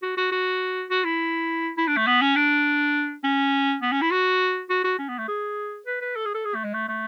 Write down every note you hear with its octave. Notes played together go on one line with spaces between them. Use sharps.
F#4
F#4
F#4
F#4
E4
E4
D4
A3
B3
C#4
D4
C#4
B3
C#4
E4
F#4
F#4
F#4
C#4
B3
A3
G#4
B4
B4
A4
G#4
A4
G#4
A3
G#3
A3
A3